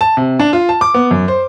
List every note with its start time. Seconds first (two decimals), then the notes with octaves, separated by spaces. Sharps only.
0.01 A5
0.17 C3
0.39 D4
0.53 F4
0.69 A5
0.81 D6
0.94 B3
1.11 F#2
1.28 C5